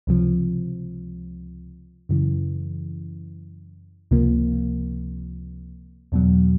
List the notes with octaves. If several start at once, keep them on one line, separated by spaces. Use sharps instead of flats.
C#2 C3 F3
F#2 C#3 E3
C#2 C3 F3 A#3
E2 B2 F#3